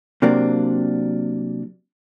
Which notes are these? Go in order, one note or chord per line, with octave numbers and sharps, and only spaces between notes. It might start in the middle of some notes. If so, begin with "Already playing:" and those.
C3 F#3 A#3 C4 D4